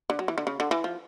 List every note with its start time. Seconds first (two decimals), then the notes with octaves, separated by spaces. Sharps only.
0.10 D3
0.19 F#3
0.28 E3
0.38 D3
0.47 C#3
0.60 D3
0.71 E3
0.84 F3